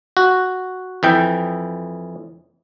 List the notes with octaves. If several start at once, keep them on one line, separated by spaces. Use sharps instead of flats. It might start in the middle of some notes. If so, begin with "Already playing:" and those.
F#4
F2 E3 G5